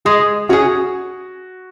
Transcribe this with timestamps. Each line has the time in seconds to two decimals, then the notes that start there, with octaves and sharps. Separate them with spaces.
0.05 G#3 G#4
0.49 C#4 F#4 G#4